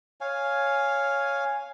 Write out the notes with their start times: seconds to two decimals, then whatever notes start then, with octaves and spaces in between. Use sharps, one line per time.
0.21 C#5 F5 G#5